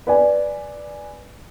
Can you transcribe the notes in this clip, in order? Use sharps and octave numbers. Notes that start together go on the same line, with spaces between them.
B4 D5 G#5